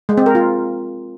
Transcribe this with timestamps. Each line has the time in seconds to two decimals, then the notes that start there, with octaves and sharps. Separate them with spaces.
0.09 G#3
0.18 C4
0.26 A#4
0.35 F4